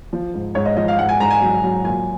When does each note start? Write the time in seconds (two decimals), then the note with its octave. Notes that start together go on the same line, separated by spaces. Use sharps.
0.13 F3
0.34 G#2
0.55 G#2 C#5
0.66 D#5
0.77 F3 D#5
0.88 F5
0.98 G#2 F#5
1.09 G#5
1.20 G#2 A#5
1.30 G#5
1.41 F#3
1.64 F#3
1.84 A#2 G#5